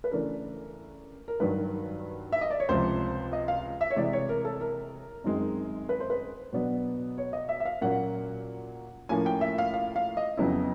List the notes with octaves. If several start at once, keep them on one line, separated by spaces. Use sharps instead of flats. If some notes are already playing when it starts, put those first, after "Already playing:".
B4
C#3 E3 A3 D4 A#4
A#4
G2 D#3 F#3 B4
E5
D#5
D5
C#5
C#2 C3 F3 C5
D#5
F5
E5
C#5
C3 E3 G#3 D5
C#5
A#4
A4
A#4
F#2 D#3 G#3 C4 D#4
B4
C5
B4
B2 F#3 B3 D4
C#5
D#5
E5
E5
F5
A#2 F#3 A#3 C#4 F#5
A2 F3 A#3 C#4 G#5
G5
E5
F5
F5
F5
D#5
F2 C#3 F#3 B3 E4